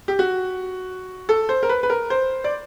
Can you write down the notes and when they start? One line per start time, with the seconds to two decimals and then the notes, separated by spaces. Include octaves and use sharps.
0.08 G4
0.19 F#4
1.29 A4
1.49 C5
1.63 A#4
1.69 B4
1.83 B4
1.90 A#4
2.10 C5
2.44 D5